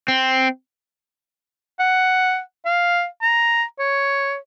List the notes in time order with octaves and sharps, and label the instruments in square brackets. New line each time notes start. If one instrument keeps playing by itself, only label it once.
[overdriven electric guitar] C4
[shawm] F#5
F5
A#5
C#5